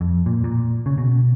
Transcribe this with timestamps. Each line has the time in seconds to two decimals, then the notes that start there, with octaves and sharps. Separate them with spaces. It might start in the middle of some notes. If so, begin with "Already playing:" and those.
0.01 F2
0.26 A#2
0.44 A#2
0.86 C#3
0.98 B2